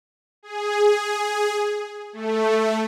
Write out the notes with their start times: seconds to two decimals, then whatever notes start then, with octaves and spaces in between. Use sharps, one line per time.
0.43 G#4
2.13 A3